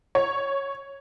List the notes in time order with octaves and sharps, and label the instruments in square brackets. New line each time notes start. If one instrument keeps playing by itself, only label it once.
[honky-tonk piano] C#5